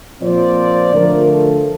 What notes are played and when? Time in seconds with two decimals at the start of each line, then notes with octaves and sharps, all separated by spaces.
0.21 A#2 F3 C4 D5
0.93 D3 F3 A3 A#4
1.30 A4